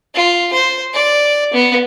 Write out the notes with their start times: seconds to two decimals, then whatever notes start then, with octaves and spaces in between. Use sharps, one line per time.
0.15 F4
0.53 C5
0.94 D5
1.54 B3